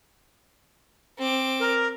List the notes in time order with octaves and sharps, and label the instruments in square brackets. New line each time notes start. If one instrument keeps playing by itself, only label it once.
[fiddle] C4 D6
[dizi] A#4